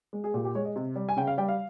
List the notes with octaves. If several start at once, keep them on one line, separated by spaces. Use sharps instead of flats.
G#3
G#4
A#2 G4
G4
G#3 C#5
D#5
C3
G3
G#5
C#3 G5
F5
G3 G5
F5